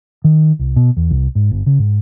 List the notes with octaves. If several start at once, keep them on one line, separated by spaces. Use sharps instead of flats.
D#3
C2
B2
E2
C2
G#2
G1
C#3
G#2